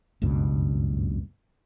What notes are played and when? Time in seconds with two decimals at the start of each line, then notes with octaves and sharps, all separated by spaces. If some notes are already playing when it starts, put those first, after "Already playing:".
0.22 F#1 C#2 G2 B2